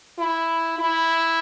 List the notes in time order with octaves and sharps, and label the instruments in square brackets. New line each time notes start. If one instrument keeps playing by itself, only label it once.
[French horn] E4
E4